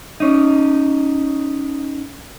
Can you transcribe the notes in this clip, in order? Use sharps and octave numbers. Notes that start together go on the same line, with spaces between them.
C#4 D#4